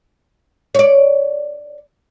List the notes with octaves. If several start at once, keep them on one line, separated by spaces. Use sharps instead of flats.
C#5 D5